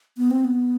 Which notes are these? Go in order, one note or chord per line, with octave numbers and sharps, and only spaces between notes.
B3
C4
B3